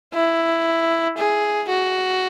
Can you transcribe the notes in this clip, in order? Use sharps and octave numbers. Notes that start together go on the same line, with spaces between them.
E4
G#4
F#4